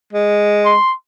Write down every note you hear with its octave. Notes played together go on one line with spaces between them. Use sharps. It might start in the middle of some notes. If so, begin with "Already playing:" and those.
G#3
C6